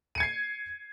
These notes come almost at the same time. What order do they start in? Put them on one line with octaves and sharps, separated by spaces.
D#7 C#7 G#6 C7